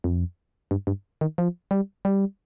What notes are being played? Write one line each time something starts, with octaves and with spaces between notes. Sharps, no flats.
F2
G2
G2
D#3
F3
G3
G3